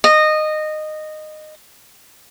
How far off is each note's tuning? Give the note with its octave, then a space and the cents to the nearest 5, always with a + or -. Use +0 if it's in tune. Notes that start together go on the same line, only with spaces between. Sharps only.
D#5 -15